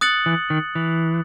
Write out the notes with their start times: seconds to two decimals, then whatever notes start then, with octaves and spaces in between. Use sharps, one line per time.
0.01 D#6 F#6 A6 C#7 F#7
0.26 E3
0.50 D#3
0.75 E3